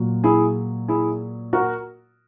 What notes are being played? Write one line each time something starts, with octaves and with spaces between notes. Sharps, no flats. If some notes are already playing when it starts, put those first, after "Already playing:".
Already playing: A#2 F#3
E4 G#4
E4 G#4
F#4 A#4